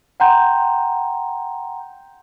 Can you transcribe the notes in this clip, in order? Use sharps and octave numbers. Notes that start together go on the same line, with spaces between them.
F#5 G5 A#5 C6 G6